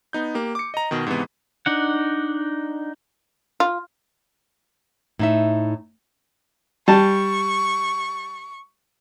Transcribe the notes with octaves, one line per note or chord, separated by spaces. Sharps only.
B3 D#4 G6
A#3 G4
D6 C#7
D#5 A#5
B2 D#3
G#2 C3 E3 B3
D4 D#4 F#5
F4
A2 D#4 E5
G3 A5 C#6